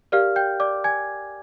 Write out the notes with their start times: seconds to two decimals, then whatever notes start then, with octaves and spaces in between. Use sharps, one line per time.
0.12 G4 A#4 D5 F5 F6
0.36 G5 G6
0.60 D5 D6
0.84 G#5 G#6